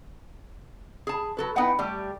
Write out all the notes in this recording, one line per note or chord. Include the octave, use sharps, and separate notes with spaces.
G#4 A5
F#3 A4 B4
B3 D#4 E4 B4 F#5 G5
G3 A3 G4